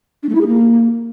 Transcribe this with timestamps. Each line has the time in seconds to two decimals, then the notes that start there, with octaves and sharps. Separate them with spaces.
0.23 D4
0.29 A3
0.35 E4
0.41 G#4
0.47 A#3